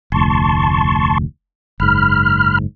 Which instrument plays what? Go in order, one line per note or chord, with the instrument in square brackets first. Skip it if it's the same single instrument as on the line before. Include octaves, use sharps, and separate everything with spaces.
[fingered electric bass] F1 D2 [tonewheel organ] A5 C6 C#6
[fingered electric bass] F#1 G#2 [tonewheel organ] B5 F6